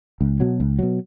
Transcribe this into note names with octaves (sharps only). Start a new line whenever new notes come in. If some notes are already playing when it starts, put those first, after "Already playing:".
C#2
B2 F#3
C#2
B2 F#3